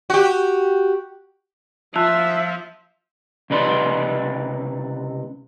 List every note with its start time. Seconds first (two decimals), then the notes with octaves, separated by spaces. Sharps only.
0.10 F#4 G4
1.96 F3 E5 A5 E6 F#6
3.50 C#2 C3 D#4 B4 D5 C6